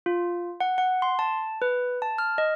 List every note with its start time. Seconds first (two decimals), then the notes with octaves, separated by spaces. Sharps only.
0.06 F4
0.60 F#5
0.78 F#5
1.02 C6
1.19 A5
1.62 B4
2.02 A5
2.18 F6
2.38 D#5